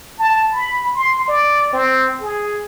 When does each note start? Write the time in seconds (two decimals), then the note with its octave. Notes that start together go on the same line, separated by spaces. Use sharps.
0.19 A5
0.52 B5
0.95 C6
1.28 D5
1.73 C4
2.21 G#4